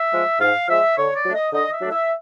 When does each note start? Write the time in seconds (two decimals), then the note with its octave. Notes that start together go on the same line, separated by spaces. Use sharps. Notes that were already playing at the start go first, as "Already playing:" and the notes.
Already playing: E5
0.12 F3 G#3
0.40 G#2 F5
0.69 F3 G#3 E5
0.97 D3 C#5
1.15 D5
1.25 F#3 A3 D4
1.35 D#5
1.53 D3 D#5
1.72 E5
1.81 F#3 A3 D4
1.91 E5